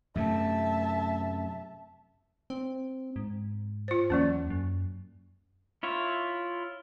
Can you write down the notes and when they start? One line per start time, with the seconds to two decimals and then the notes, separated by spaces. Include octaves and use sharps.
0.15 F#2 C3 A3 E5 A5
2.50 C4
3.16 G#2
3.88 F4 C5
4.10 E2 F#3 A#3 C#4
4.50 F#2
5.83 E4 F4 C#5